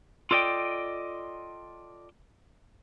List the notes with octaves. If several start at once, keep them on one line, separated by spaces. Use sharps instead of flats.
F4 A4 D5 D#5 G5